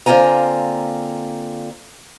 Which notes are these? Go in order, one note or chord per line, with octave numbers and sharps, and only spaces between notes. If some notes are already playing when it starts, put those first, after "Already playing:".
D3 A#3 C4 F4 G#5 A#5